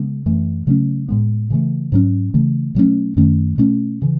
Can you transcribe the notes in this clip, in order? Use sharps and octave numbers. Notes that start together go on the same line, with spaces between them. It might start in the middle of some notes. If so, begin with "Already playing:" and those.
Already playing: C#3 G#3 B3
F#2 E3 A3
C#3 F#3 A3 C#4
A2 G#3 B3
C#3 E3 A3
G#2 F#3 C#4
C#3 E3 A3
B2 F#3 A3 C#4
F#2 D#3 A3 C#4
B2 A3 C#4
C#3 E3